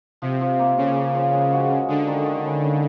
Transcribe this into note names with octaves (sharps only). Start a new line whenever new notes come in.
C3 F3
F3
A#3
C#3 C#4
C#4
F3
G#3
F#4
C#4
D3 G#3
D#3
D#3
C#3
C#3